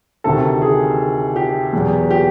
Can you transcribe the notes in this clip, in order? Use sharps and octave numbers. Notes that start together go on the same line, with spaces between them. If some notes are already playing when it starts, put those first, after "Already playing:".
D2 C3 D#3 A4
G#4
G4
E2 B2 F#3
G4